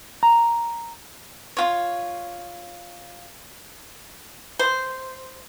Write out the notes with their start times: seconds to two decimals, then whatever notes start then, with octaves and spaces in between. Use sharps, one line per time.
0.23 A#5
1.57 F4 C#5
4.59 C5